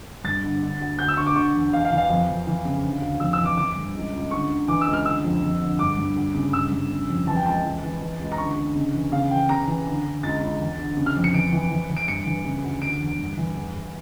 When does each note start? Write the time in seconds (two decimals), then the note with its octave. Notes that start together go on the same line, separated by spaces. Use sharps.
0.24 G2 A6
0.43 D3
0.62 D3
0.81 D2
0.99 D2 G6
1.08 E6
1.17 D3 C#6
1.26 D6
1.36 D3 C#6
1.54 E2
1.73 E2 F5
1.85 F5
1.92 E3
1.98 F5
2.10 F2 F5
2.28 F2
2.47 E3
2.65 C#3
2.83 D3
3.01 D2
3.20 F2 E6
3.33 E6
3.39 E3
3.45 D6
3.57 E3 D6
3.76 G2
3.94 C#2
4.13 C#2
4.31 D3 C#6
4.50 D3
4.68 E3 D6
4.81 E6
4.87 C#2
4.93 F6
5.05 D3 E6
5.24 F2
5.43 F2
5.61 D3
5.79 G2 D6
5.97 G2
6.16 D2
6.35 C#3
6.53 G2 E6
6.72 G2
6.90 C#3
7.09 F2
7.27 E3 A5
7.36 G5
7.46 C#2 A5
7.64 E3
7.83 E3
8.01 E3
8.19 C#2
8.32 A#5
8.38 D3 C#6
8.56 D3
8.75 C#3
8.93 E3
9.12 C#3 F5
9.31 E3 G5
9.49 C#3 A#5
9.68 E3
9.87 D3
10.04 D3
10.23 C#2 A6
10.41 C#2
10.60 E2
10.78 D3
10.97 C#3
11.06 F6
11.16 F2
11.24 C#7
11.34 E3 D7
11.52 E3
11.70 E3
11.90 E3
11.97 D7
12.08 G2 C#7
12.26 E3
12.45 C#3
12.64 D2
12.82 D3 D7
13.00 E2
13.19 G2
13.37 E3
13.56 E2
13.74 E2